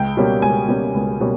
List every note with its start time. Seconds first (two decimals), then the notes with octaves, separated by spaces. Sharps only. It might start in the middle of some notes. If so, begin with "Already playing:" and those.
Already playing: C#2 G5
0.17 B2 G3 A#3 C#4
0.42 C#2 G#5
0.68 B2 G3 A#3 C#4
0.94 C#2
1.20 B2 G3 A#3 C#4